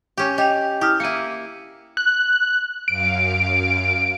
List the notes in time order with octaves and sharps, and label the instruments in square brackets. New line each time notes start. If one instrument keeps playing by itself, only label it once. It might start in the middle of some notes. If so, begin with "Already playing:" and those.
[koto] C#4 G4
[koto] G4 [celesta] D#5 G5 F7
[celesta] E4 D#6 F6 [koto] G4
[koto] A#3 E4 [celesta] C#7 D#7
[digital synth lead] F#6
[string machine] F#2 F5 [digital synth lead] D7